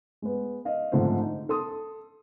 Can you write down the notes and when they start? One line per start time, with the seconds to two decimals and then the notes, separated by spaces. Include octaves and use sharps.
0.22 G#3 B3
0.65 D#5 F5
0.92 G#2 D3 F3 A3 C4
1.19 D#4
1.49 A4 C6 D#6